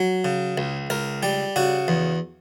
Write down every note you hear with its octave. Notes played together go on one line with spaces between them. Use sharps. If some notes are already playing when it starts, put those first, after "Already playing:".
Already playing: F#3
C#3
C#2
C#2 A#4
G3 G4
C#3 F#4
E2